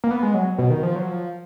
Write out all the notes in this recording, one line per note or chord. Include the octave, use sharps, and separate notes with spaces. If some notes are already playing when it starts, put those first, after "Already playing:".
A#3
B3
G#3
F#3
B2
D#3
F3
F#3
F3